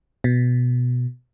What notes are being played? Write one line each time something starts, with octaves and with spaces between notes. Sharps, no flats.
B2